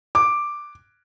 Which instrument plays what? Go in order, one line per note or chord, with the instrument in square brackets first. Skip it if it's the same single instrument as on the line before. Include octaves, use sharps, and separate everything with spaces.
[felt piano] D6